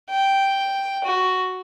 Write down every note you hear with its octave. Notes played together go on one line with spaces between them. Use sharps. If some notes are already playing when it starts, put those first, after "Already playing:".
G5
F#4